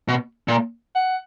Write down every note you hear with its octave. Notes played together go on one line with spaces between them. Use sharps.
B2
A#2
F#5